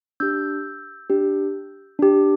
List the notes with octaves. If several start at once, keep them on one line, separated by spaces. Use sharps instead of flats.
D4 G4 E6 G6
D4 G4
D4 G4